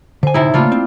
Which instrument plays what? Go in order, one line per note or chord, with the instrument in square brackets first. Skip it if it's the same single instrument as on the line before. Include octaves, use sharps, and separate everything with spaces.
[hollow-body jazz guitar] D3 G#5 [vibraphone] C5
[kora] A2 C3 E4 [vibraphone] D#4
[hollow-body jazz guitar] C#3 [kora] G3 D4 F4 [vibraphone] A3 A#3
[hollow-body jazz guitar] C4 [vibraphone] E4